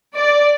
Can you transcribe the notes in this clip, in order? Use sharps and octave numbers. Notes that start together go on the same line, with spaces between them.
D5